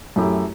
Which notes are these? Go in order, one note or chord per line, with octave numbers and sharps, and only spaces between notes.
F#2 F#3 A3 E4 G4